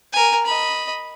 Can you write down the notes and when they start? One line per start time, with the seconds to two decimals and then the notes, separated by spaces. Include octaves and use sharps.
0.13 A#4 G#5
0.46 D#5 B5